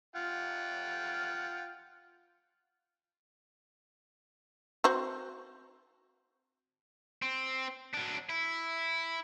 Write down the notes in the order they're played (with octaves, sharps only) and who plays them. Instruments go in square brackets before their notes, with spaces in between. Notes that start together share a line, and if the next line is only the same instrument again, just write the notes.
[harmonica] F4 F#5 G5
[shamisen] C4 F#4 C5
[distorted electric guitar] C4
F#3 D4
E4